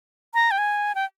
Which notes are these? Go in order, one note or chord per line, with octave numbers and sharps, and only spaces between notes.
A#5
G5
G#5
G5